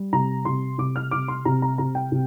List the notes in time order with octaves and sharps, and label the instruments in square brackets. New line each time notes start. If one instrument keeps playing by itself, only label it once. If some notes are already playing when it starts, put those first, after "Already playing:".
Already playing: [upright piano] G3
C3 A#5
C3 C6
C3 D6
F6
C3 D6
C6
C3 A#5
A#5
C3 A#5
G5
C3